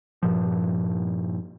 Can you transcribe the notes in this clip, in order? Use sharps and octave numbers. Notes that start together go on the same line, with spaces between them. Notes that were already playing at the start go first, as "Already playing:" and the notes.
G2 A#2 F3